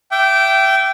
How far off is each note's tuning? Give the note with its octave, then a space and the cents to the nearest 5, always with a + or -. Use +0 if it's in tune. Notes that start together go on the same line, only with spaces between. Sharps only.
E5 +25 G5 -20 D6 +0